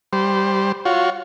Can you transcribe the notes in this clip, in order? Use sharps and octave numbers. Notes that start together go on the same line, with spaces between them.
G3 C5
F4 F#4 C#5